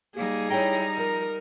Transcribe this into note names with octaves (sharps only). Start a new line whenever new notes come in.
G3 A#3 D#4 G#4
E4 C#5 G5 A#5
F3 A#4